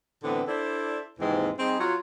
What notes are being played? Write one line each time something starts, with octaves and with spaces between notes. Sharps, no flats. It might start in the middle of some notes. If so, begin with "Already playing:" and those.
A2 D3 E3 B3 C4 D4
D4 E4 A4 C5 D5
D#2 G#2 C3 E3 G#3 C4
G3 C4 D#4 G#4
F#3 F4 C#5